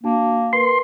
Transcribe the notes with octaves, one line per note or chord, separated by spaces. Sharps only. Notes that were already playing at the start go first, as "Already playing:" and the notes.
A#3 D4 F#4 A5
A#4 B4 C6